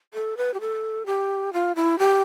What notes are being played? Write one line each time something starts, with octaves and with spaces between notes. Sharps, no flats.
A4
B4
G4
A4
G4
F4
E4
G4